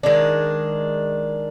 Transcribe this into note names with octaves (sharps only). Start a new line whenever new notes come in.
D#3 G#3 D4